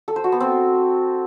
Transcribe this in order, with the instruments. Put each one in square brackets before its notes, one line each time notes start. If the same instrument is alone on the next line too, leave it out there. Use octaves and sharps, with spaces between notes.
[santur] A4
C5
F#4
B3
C4